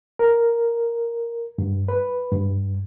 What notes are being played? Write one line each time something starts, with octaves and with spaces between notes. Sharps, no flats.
A#4
G2
B4
G2